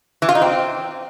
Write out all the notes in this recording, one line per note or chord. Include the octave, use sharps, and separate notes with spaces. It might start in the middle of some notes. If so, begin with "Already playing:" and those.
E3
F4
D#4
C4